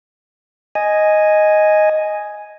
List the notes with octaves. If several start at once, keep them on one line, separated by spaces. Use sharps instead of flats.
D#5 G#5